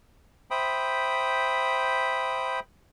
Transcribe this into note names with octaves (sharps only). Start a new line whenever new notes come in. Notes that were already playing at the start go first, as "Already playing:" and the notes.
C5 E5 G5 B5 D#6